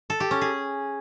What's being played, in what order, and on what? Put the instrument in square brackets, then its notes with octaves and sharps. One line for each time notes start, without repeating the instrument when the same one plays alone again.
[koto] A4
G4
C#4
G#4